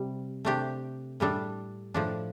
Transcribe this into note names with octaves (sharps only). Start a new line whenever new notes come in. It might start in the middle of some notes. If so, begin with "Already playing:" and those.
Already playing: C3 G3
C3 A3 D4 G4
A2 G3 D4 A4
A2 F3 D4